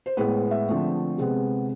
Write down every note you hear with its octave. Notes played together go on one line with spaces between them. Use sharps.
C5
A2 G#3 B3 B4
E5
D3 F3 A3 C4
C3 G#3 B3